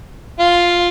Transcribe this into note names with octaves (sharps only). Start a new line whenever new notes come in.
F4